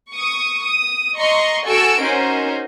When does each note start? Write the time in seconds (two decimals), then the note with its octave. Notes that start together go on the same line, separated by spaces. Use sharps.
0.11 C#6 D#6
0.62 D#6
1.16 D#5 A#5 C6 C#6
1.65 F#4 A4 G#5 C#6 E6 D7
2.01 C#4 D#4 F#4 A#4 C5